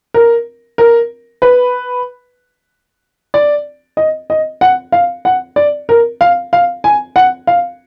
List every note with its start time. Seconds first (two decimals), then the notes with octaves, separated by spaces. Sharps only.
0.14 A#4
0.78 A#4
1.42 B4
3.34 D5
3.97 D#5
4.30 D#5
4.61 F#5
4.92 F5
5.25 F#5
5.56 D5
5.89 A#4
6.21 F5
6.53 F5
6.84 G#5
7.16 F#5
7.47 F5